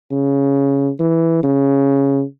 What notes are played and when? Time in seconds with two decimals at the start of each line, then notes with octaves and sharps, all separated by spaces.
0.11 C#3
0.99 E3
1.43 C#3